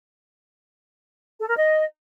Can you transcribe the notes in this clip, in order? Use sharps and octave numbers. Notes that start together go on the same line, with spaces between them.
A4
A#4
D#5